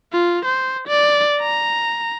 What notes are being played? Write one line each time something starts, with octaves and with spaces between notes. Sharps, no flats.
F4
C5
D5
A#5